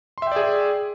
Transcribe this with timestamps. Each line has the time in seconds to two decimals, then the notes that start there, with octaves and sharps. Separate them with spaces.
0.18 C6
0.22 E5
0.27 G5
0.32 D5
0.36 G#4